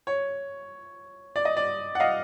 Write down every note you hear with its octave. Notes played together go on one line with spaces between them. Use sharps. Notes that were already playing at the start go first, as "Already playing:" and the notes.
C#5
D5
D#5
D5
F#5
D#5 F5